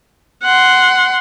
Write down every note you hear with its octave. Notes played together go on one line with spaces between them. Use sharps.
F#5 C6